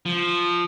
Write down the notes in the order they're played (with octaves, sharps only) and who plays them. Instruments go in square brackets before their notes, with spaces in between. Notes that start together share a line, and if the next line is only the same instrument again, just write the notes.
[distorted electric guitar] F3